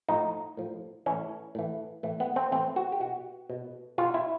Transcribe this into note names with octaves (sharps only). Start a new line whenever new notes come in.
A2 F3 D#4
A2 F3
A2 E3 C#4
A2 E3
A2 E3
B3
C4
A2 E3 C4
F#4
G4
B2 F#4
B2
B2 F4
E4